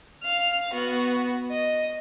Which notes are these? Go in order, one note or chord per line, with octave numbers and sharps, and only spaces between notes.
F5 F6
B3 F#4
D#5